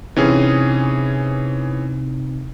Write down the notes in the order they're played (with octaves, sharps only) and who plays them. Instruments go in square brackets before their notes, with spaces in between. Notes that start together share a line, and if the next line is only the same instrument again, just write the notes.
[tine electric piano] C3 C4 D#4 [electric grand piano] E3 C#4 G#4